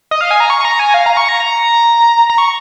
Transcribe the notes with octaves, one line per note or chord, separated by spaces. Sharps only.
D#5
F5
G#5
A#5
C#6
A#5
G#5
F5
A#5
C#6
A#5
A#5
A#5
C#6